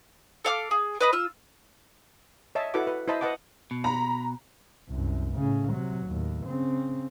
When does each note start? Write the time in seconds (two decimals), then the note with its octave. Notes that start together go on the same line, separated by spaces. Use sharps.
0.45 A4 F5 D6 F6
0.71 G#4
1.00 B4 D#5 B5
1.13 F4 E6
2.55 C#5 D#5 E5 A5
2.74 E4 F#4 A4 B4 F#5 D6
2.87 B4
3.08 E4 C5 D#5 A5 B5
3.21 B4 D#5 F#5 A5 D6
3.71 B2
3.84 A#5 B5
4.90 C2 F#2
5.35 A2 C#3
5.73 C3 F#3
6.07 D#2 A2
6.45 C#3 C4